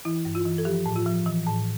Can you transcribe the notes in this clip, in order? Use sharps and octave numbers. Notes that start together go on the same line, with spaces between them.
E3 E4
G2
F4
E3
A4
F3 G4
A2
F4
F3
E3
A2